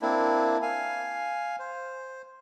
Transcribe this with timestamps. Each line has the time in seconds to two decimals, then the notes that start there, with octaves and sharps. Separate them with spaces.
0.02 A#3 C4 D4 E4
0.62 F5 G#5
1.59 C5